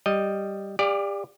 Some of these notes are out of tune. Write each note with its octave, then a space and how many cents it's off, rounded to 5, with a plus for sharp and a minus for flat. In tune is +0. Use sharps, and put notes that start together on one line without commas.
G3 +0 D#5 -5
G4 +35 D5 +5 F5 +0